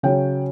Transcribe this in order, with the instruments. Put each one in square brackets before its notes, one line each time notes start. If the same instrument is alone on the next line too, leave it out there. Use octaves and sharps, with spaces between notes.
[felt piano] C#3 F#3 C#4 G5